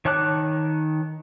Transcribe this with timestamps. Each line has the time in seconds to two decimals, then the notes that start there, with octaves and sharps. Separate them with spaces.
0.05 D#3 C#5 A5 D6 F#6